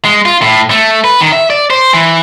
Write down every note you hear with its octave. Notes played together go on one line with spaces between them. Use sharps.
G#3
F4
A2
A3
B4
D#3
E5
D5
C5
E3